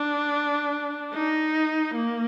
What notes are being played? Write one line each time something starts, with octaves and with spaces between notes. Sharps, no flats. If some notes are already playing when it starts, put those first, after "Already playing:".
Already playing: D4
D#4
A#3